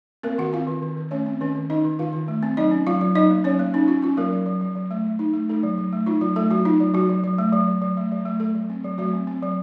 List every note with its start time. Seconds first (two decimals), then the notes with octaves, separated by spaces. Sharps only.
0.23 A#3 C4 A#4
0.38 D#3 F#4 F#5
0.53 C4 F4 F5
0.67 D#3
0.82 D#3
0.97 D#3
1.11 A3 C#4 C#5
1.26 C4
1.40 D#3 C#4 C#5
1.55 D#3
1.70 D#3 D#4 D#5
1.85 D#3
1.99 D#3 F4 F5
2.13 D#3
2.28 A3
2.43 C4
2.57 F#3 D#4 D#5
2.71 C#4
2.87 F#3 F4 F5
3.01 F#3
3.15 F#3 D#4 D#5
3.30 A#3
3.44 F#3 C#4 C#5
3.59 A#3
3.74 C#4 D#4
3.88 C#4 F4
4.02 C#4 F4
4.17 F#3 A#3 A#4
4.33 F#3
4.46 F#3
4.61 F#3
4.75 F#3
4.91 A3
5.04 A3
5.19 D#4
5.34 A3
5.49 A3 D#4 A4
5.63 F#3
5.78 F#3
5.93 A3
6.06 D#4 F4
6.21 F#3 F4
6.36 A3 A4
6.50 F#3 F#4
6.65 D#4 F4
6.80 F#3
6.94 F#3 F#4
7.09 F#3
7.24 F#3
7.38 A3
7.53 F#3
7.68 F#3
7.82 F#3
7.97 A3
8.12 F#3
8.26 A3
8.40 A3 A4
8.55 F#3
8.70 C4
8.84 F#3
8.98 F#3 A3 F#4
9.13 C4
9.27 C4
9.43 F#3